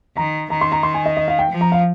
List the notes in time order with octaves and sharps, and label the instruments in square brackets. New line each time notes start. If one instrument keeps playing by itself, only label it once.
[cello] D#3 [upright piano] A#5
[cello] D#3 [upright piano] A#5
[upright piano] C6
A#5
C6
G#5
D#5
D#5
F5
G5
[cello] F3
[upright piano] A#5
F5